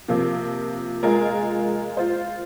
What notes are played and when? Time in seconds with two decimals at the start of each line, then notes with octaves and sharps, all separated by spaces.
0.08 C3 F3 A#3
1.03 G#3 F4 A#4
1.97 F4 C5